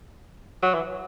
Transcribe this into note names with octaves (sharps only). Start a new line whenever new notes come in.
F#3
E3